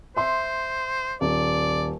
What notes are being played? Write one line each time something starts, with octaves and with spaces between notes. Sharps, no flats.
C5 E5 C6
D#1 D5